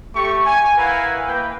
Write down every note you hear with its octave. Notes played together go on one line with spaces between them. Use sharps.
A3 G4 C#6
G#5
E4 A#4 B4 F5 F#5 G#5
A#3 E4 B4 G5